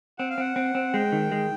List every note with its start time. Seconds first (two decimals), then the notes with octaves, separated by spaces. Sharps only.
0.18 C4 F#5
0.30 F5
0.38 C4 F#5
0.56 C4
0.75 C4
0.93 G#3 G5
1.12 D#3
1.32 G#3